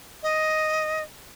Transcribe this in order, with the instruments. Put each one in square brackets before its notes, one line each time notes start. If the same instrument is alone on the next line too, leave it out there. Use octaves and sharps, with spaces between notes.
[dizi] D#5